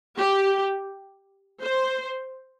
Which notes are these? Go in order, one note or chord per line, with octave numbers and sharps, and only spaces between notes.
G4
C5